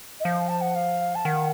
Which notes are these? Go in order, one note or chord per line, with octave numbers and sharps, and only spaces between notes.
D#5
F3 F5
A5
F#5
F5
A5
D#3 F#5